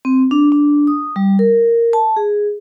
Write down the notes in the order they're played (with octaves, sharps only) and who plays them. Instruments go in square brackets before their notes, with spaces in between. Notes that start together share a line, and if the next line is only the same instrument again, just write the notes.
[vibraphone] C4
D4
D4
D#6
G3
A#4
A5
G#4